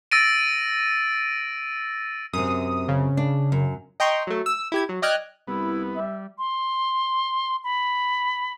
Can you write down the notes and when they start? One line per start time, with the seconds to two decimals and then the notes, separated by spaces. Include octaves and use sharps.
0.11 E6 A6 A#6 D7 D#7
2.33 F#2 C3 D#6
2.88 C#3
3.17 D4
3.52 F#2
4.00 D#5 G5 A#5 C6 C#6
4.27 F#3 A3
4.46 E6
4.72 E4 G4 G#6
4.89 F#3
5.02 D5 D#5 G5 F6 F#6 G#6
5.47 C2 B3 E4
5.96 G3 E5
6.37 C6
7.64 B5